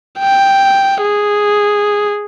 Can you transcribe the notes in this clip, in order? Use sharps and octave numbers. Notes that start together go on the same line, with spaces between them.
G5
G#4